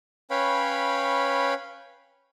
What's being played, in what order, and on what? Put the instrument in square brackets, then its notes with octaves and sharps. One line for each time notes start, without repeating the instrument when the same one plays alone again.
[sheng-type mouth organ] C#4 B4 C#5 F5 G5 B5